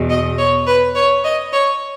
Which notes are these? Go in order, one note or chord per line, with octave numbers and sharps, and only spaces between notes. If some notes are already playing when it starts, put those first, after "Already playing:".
Already playing: E2 B2
D#5
C#5
B4
C#5
D#5
C#5